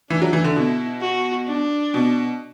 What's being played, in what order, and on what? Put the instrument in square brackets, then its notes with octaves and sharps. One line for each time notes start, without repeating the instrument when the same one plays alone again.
[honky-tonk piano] E3 [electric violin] D4
[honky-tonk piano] F#3
E3
D3
[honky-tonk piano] B2 [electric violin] E4
[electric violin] F#4
D4
[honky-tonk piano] B2